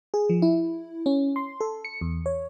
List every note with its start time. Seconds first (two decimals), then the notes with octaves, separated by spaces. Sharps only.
0.14 G#4
0.29 F3
0.42 E4
1.06 C#4
1.36 C6
1.61 A4
1.85 C#7
2.01 E2
2.26 C#5